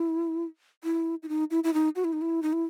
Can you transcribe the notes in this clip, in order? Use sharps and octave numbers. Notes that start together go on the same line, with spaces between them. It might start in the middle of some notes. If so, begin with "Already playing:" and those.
Already playing: E4
E4
E4
D#4
E4
E4
D#4
F#4
E4
D#4
E4
D#4
E4